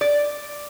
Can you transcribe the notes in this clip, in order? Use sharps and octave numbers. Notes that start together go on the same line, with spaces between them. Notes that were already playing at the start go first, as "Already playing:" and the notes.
D5